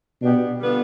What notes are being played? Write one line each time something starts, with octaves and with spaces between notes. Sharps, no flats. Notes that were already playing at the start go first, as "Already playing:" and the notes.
B2 B3 D4 G4
D3 G3 B3 F4